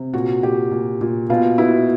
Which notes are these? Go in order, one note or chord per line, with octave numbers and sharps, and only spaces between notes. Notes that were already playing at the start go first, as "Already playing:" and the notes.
Already playing: C3
A#2 F#4
A#2 G4
A#2
A#2
B2 F4
B2 E4